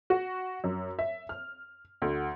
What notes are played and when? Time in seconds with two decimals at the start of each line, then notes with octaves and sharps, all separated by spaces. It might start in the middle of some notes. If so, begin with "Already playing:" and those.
0.10 F#4
0.64 F#2
0.99 E5
1.29 F6
2.02 D2